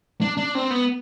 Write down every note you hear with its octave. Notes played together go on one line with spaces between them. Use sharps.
D4
D4
C4
B3